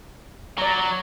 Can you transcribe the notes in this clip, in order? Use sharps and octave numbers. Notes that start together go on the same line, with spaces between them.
F#3 D5 A#5